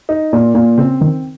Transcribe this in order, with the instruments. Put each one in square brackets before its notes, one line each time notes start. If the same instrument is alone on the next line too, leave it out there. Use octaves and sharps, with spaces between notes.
[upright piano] D#4
A#2
A#2
[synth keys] C#3 [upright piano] C4
[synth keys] D#3 [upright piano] C4